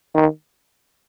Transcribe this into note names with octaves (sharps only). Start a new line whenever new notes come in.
D#3